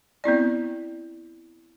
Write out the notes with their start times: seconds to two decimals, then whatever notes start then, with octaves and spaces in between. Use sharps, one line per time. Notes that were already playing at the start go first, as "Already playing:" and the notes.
0.24 B3 C4 E4 D5